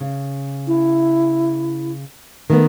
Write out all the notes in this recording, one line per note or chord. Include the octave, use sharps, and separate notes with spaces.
C#3
E4
D#3 A3 B3